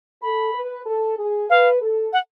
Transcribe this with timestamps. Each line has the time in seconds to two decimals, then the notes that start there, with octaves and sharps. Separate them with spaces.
0.21 A4 B5
0.54 B4
0.85 A4
1.17 G#4
1.50 B4 F5
1.81 A4
2.13 F#5